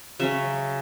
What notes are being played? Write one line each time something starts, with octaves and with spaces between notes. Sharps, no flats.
C#3 F#3 C#4 E5